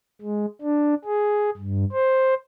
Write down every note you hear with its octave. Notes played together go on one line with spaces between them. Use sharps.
G#3
D4
G#4
G2
C5